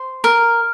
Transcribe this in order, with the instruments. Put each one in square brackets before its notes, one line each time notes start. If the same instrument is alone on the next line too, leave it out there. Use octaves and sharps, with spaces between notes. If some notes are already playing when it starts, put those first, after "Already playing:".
Already playing: [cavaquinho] C5
[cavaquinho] A#4 [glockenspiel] F6